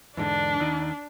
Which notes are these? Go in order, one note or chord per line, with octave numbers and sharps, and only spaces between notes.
E2 G#2 D3 D4
D#2 D#3